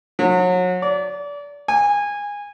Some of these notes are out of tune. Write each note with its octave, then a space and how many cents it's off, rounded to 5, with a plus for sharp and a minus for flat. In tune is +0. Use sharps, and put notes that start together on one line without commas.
F#3 -30
D5 -30
G#5 -20